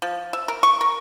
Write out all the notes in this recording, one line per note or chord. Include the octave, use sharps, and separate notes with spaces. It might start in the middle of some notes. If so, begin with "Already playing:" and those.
F3
E5
A#4
C#6
A#4